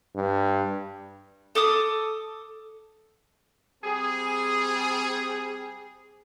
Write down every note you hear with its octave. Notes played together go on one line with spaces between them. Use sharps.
G2
A4 D6 D#6
G3 C4 G#4